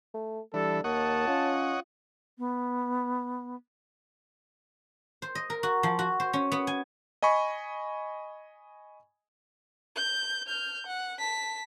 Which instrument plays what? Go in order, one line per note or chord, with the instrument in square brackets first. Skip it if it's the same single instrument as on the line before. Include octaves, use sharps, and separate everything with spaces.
[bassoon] A3
[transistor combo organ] E3 [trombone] G3 [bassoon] D4 [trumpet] A4
[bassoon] D#2 [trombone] A#3 [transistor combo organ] C#5 D#5 F#5 [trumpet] A5
[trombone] C#4 [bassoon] F4
[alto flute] B3
[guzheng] C5
D#5
A#4
F#4
F3
F#4
C5
C#4
B3
G#5
[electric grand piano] D#5 G#5 B5 C#6
[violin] G6
F6 G6
F#5
A5 B6